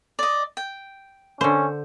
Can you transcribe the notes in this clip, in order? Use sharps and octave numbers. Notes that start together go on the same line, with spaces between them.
D5 D#5
G5
D3 C#4 C5